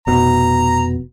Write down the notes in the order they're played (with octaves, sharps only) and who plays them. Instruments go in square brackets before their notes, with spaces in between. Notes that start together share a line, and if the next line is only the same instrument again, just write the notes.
[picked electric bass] F1 B2 [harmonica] A#5